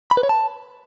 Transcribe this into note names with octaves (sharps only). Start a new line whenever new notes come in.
B5
B4
C#5
A5